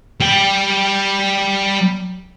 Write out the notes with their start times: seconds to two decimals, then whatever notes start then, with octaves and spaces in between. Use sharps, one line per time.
0.20 G3 G5